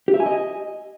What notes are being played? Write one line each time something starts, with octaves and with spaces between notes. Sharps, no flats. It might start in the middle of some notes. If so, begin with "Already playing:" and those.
G4
E5
G#5
D#5